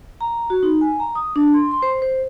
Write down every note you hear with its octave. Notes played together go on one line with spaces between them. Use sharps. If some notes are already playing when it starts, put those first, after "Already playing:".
A#5
F#4
D#4
G#5
A#5
D#6
D4
C6
C6
C5
C5